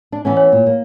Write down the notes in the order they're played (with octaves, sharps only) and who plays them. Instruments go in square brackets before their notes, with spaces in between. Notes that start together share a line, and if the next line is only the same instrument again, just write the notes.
[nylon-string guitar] D4
E3 B3 C#4
[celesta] C#5
[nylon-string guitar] A#2
A#3